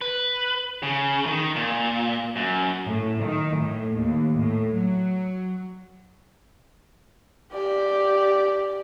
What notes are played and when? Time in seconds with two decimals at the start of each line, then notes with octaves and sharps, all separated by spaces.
0.01 B4
0.83 C#3
1.26 D#3
1.56 A#2
2.36 F#2
2.87 A2
3.25 D#3
3.57 A2
3.96 D#2
4.39 A2
4.76 F#3
7.53 G4 D5